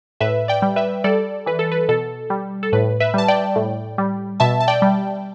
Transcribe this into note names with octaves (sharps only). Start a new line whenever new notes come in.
A2 B4 E5
D5 G5
G3
B4 E5
G3 A4 D5
E3 B4
A4
B4
B2 A4
G3
A4
A2 B4
B4 E5
G3 A5
D5 G5
A2
G3
B2 E5 A5
A5
D5 G5
G3